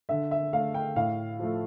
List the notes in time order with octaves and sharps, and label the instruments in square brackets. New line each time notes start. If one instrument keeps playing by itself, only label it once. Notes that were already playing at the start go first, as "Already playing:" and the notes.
[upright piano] D3 E5
E5
A3 F5
G5
A2 F5
F3 A3